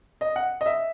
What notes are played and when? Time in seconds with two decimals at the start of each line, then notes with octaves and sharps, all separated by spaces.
0.21 D#5
0.36 F#5
0.61 D#5
0.66 E5